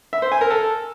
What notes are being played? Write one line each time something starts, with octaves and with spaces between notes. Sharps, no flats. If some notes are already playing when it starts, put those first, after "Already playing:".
E5
C5
G#5
A#4
A4